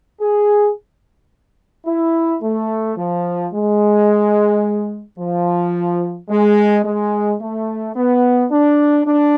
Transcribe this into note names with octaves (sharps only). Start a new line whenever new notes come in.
G#4
E4
A3
F3
G#3
F3
G#3
G#3
A3
B3
D4
D4